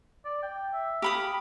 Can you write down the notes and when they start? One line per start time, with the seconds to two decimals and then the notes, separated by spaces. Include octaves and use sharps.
0.25 D5
0.43 G5
0.73 E5
1.02 G4 F5 B5 D#6